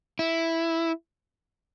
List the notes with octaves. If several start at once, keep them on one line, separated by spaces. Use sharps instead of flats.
E4